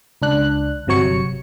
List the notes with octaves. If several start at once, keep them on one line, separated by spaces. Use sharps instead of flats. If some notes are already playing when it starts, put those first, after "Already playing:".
C#2 D4 F#6
G1 C3 F#3 C#5 C#7